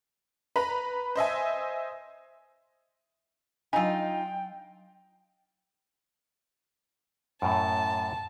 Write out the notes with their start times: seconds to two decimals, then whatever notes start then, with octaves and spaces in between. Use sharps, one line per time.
0.56 B4 A#5 B5
1.16 C5 D#5 E5 G#5
3.73 F#3 D4 D#4 F4 G5 G#5
7.42 F#2 A2 A5